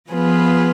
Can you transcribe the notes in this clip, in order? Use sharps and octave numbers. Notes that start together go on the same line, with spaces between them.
F3 B3 F4 G#4 B4